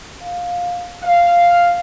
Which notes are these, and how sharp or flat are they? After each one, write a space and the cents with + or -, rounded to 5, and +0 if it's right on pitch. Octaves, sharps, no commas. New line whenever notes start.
F5 +15
F5 -5